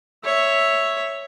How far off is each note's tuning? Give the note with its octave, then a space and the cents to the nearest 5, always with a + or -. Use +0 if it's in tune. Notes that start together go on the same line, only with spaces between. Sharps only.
C#5 +0 E5 +0